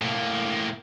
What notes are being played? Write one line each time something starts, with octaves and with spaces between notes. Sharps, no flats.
A2 A#3